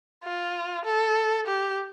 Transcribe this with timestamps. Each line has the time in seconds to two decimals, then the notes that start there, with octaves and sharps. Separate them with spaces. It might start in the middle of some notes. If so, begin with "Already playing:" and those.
0.24 F4
0.85 A4
1.47 G4